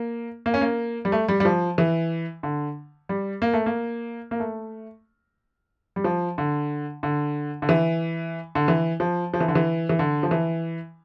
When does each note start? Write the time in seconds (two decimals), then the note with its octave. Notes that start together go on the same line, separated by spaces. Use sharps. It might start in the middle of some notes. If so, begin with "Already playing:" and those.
Already playing: A#3
0.46 A#3
0.54 C#4
0.61 A#3
1.05 G3
1.12 A3
1.28 G3
1.40 G3
1.45 F3
1.78 E3
2.43 D3
3.09 G3
3.42 A#3
3.53 A3
3.66 A#3
4.31 A#3
4.40 A3
5.96 G3
6.04 F3
6.38 D3
7.03 D3
7.62 D3
7.69 E3
8.55 D3
8.68 E3
9.00 F3
9.34 F3
9.41 E3
9.48 D3
9.55 E3
9.89 E3
9.99 D3
10.23 F3
10.31 E3